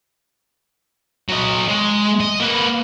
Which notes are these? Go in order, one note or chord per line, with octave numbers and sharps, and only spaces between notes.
F#3 D#5
G#3
D#5
A#3 B4